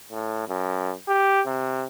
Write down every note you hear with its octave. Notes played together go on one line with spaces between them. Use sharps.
A2
F#2
G4
C3